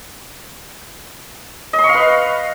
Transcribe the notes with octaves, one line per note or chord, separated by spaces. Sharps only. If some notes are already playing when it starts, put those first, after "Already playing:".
D#5
C6
C#6
F5
B4